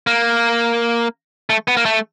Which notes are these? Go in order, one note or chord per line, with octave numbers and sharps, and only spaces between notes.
A#3
A3
B3
A#3
A3